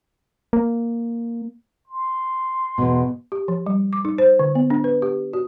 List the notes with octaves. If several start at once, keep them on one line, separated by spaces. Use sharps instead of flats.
A#3
C6
E2 B2
G4
F3
G3
D6
D#4
C5
D3
B3
D4
B4
G4
F#4